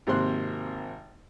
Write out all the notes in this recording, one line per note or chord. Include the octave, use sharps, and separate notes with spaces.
G#1 C3 A#3 C5 C6 F#6